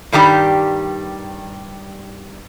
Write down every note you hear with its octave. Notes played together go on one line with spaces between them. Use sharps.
G2 D#3 G3 G4